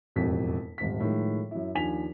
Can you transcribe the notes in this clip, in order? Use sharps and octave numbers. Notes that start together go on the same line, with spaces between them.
E1 A1 F2 B6
D#1 G#1 B6
A2 D#3 F3 G#3
F#2 E4
D#2 F3 D4 G#5 B6 F7